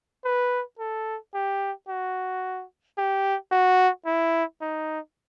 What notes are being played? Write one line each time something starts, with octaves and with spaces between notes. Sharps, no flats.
B4
A4
G4
F#4
G4
F#4
E4
D#4